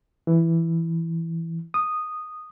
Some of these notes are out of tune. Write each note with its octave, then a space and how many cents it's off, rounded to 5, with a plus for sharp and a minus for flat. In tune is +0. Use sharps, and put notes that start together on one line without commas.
E3 +5
D#6 -10